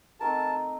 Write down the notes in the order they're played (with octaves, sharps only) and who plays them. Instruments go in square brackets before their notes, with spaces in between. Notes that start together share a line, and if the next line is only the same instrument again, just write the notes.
[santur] A3 C4 D#4 A#4 [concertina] A5